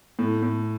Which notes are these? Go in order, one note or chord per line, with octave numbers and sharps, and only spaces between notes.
A2
A2